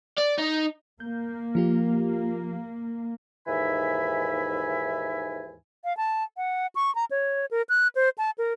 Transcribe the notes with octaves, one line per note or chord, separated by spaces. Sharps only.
D5
D#4
A#3 G6
F3 F4 G4
D#2 G#2 E3 E5 G#5 B5
F5
A5
F#5
C#6
A#5
C#5
A#4
F#6
C5
A5
A#4